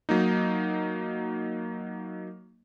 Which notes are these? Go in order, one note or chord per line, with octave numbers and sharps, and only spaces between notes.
F#3 A#3 D#4